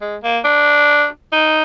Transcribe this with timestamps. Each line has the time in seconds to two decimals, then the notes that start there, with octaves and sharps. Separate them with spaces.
0.01 G#3
0.23 A#3
0.45 D4
1.33 D#4